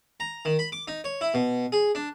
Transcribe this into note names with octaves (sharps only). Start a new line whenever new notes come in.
A#5
D#3
B5
D6
D#4
C#5
E4
B2
G#4
D4